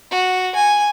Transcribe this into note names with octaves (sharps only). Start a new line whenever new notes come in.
F#4
G#5